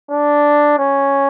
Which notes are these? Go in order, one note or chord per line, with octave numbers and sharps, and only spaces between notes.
D4
C#4